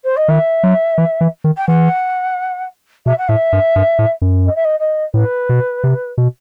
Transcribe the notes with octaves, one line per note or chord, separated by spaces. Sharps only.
C5
D#5
D#3 E5
F#3
E3
E3
D#3
G5
E3 F#5
B2 E5
F#5
A2 E5
G2
G2
A2
F#2
D#5
E5
D#5
D#5
A2 B4
B2
C3
B2